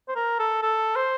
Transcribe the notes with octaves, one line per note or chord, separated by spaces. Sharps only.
C5
A#4
A4
A4
C5